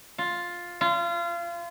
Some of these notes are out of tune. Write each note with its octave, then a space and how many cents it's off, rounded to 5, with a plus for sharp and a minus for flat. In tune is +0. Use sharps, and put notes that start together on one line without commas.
F4 +5
F4 -30